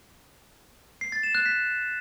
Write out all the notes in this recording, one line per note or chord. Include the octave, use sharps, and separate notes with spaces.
C7
A6
E7
F#6
B6